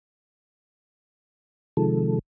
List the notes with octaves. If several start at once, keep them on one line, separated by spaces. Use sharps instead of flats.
C3 D#3 F3 G#3 A4